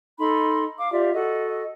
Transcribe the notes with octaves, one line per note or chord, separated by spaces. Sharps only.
D#4 A4 B5 C6
F5 D6
F4 G4 D5 E5
F#4 A4 D#5